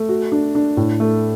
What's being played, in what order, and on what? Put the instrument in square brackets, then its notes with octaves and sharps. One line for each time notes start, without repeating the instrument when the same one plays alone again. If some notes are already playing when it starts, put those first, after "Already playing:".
Already playing: [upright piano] A3
F#4
D4
D4
A2
A3